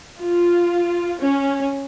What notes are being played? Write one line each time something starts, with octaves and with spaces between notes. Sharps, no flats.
F4
C#4